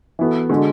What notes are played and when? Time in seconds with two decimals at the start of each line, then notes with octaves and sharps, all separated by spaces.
0.19 E3 B3 F#4 A4
0.50 D3 G#3 D4 F#4 A4